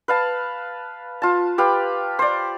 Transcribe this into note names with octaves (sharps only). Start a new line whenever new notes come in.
B4 F5 A5
F4 A5
G4 B4 F5
C5 D5